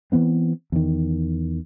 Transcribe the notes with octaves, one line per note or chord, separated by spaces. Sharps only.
E3 F#3 B3 C4
E2 D#3